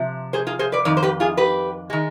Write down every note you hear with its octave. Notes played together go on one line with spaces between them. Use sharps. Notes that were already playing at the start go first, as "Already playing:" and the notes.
Already playing: C3 F3
G#4 C5
F4 G#4
G#4 C5
B4 D5
F2 D#3 D5
C5
G4 B4
F4 G#4
G4 B4
D#3 G#3